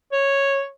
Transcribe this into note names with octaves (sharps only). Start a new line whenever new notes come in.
C#5